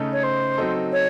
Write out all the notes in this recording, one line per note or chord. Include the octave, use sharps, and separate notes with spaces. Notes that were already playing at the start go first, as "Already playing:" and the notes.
Already playing: C#3 A3 D#4 A4
C#5
C5
F#3 C4 D#4 A4
C#5